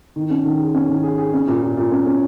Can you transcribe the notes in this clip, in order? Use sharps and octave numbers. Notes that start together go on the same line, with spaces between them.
D#3
C#4
D#3
G#4
C#4
D#3
G#4
G#4
C#4
A#2
A#2
A#2
C#4
C#4